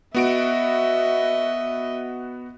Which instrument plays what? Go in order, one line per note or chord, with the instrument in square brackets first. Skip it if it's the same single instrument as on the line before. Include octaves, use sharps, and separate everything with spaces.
[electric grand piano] B3 F#4 D7 [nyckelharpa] D#5 E5